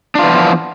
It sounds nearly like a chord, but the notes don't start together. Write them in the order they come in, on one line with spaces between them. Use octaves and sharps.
D4 F4 E3 B3 F3